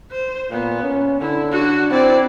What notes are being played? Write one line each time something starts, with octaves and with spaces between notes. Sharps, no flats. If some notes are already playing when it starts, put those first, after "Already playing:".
C5
A#2 B3
C#4
D3 E4
D4 F#4
C4 E4 D5